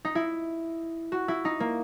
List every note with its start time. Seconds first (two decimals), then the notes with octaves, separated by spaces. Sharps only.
0.05 D#4
0.15 E4
1.12 F#4
1.28 E4
1.45 D#4
1.60 A#3